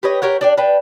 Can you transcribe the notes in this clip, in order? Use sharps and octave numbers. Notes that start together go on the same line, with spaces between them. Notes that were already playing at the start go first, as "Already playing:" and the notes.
G4 B4 C#5 D#5
G4 A#4 C#5 F#5
D4 D5 G5
D4 B4 G5